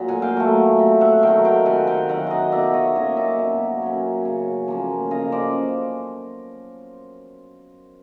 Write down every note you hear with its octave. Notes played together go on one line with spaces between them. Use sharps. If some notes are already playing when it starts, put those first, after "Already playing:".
Already playing: A#2 F#3
F#5 G#5
F5 G5
F#3 A3
C3
E5 F#5
D#3 F#3 F5 G5
F5 G5
C3 F#5 G#5
F5 G5
D#3 F#3 E5 F#5
D#5 F5 F#5
B2 D5 E5
C#5 D#5
F#3 A#3 C#4 C#5 D#5
D5 E5
B2
F#3 A#3 C#4
C#3
F3 A#3 C#4
C#3 D#5 F5
C5 D5